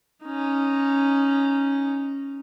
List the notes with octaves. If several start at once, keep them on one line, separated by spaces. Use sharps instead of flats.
C#4 D#4